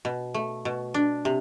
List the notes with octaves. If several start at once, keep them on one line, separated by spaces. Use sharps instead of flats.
B2
A3
B2
D4
C3